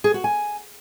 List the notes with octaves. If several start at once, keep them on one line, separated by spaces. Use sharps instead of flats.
G#4
F#4
G#5